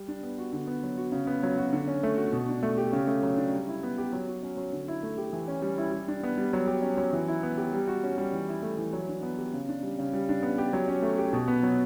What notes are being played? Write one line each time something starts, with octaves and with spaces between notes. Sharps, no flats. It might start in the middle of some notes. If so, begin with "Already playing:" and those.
Already playing: G3
D4
B3
F#4
D3
B3
F#3
F#4
C#3
B3
F#3
F#4
D3
C#4
A3
F#4
B2
D4
A3
G4
C#3
A3
F#3
D4
G3
E4
B3
G4
F#3
F#4
C#4
F#3
D3
E4
A3
G4
E3
C#4
G3
E4
G3
D4
B3
G3
F#3
G4
C#4
F#3
E3
E4
B3
G4
G3
F#4
C#4
G3
E3
E4
A3
E3
F#3
D4
B3
G4
C#3
D4
G3
C#3
G3
D4
B3
G4
F#3
C#4
A3
G4
B2
B3
F#3